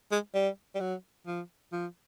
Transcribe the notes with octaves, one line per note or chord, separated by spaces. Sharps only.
G#3
G3
G3
F#3
F3
F3